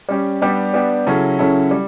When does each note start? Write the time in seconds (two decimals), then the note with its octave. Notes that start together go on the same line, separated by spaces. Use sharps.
0.09 G3 C#4 G4
0.41 G3 B3 D4 G4
0.74 G3 B3 D4 G4
1.07 C#3 F#3 C#4 E4 A4
1.39 C#3 F#3 C#4 E4 A4
1.71 G3